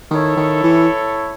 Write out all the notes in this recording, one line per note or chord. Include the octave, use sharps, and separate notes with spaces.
D#3 E4 A4 C#5
D#3
E3